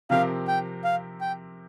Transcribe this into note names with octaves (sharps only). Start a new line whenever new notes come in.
C3 F3 C4 G4 A#4 F5
G5
F5
G5